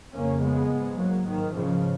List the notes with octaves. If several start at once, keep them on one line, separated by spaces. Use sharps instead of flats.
F2 C#3 A#3 C#4
G#3 B3
G#2
F#3 A#3
G#2 D#3
C#3 F3